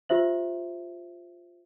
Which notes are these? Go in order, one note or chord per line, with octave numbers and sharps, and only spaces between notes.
F4 G4 C5 E5 F#7